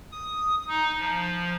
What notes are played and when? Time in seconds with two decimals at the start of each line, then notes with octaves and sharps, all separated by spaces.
0.12 D#6
0.68 D#4
0.99 F3